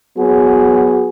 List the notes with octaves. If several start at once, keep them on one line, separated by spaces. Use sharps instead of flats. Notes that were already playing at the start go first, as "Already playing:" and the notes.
F#3 B3 F#4 G#4